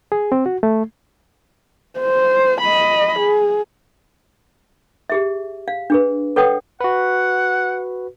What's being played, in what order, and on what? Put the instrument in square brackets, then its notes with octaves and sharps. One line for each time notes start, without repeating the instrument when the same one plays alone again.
[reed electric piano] G#4
C4
F#4
A3
[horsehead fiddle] C5
D#5 B5
G#4
[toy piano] G4 G#4 E5
F5
D4 G#4 B4
A4 B4 C#5 F#5 G5 D#6
[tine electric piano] F#4 B4 [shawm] F#5